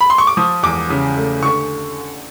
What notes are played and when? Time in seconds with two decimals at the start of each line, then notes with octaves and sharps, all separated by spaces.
0.01 B5
0.10 C6
0.18 C#6
0.27 D6
0.37 F3 D#6
0.63 E2 D6
0.90 C#3
1.17 A3
1.43 D3 C#6